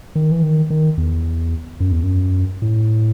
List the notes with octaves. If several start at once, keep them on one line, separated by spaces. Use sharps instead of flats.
D#3
E3
D#3
D#3
E2
F#2
E2
F#2
A2